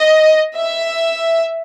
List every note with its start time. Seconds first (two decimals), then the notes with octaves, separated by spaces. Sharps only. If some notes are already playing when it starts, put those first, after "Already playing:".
Already playing: D#5
0.58 E5